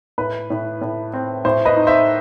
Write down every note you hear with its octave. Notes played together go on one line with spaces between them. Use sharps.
A2 B4
A2
A2
C4
A2 C5
B4 D#5
D#4
C5 E5